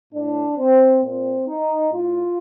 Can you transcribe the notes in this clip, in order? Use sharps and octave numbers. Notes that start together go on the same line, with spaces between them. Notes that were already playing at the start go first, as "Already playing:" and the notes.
A2 D4
C4
A#2 C4
D#4
A2 F4